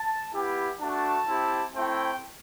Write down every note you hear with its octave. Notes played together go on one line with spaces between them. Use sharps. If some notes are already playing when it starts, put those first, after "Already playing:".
Already playing: A5
B3 E4 G4
A3 D4 F#4 A5
C4 E4 G4
A3 C4 E4 G5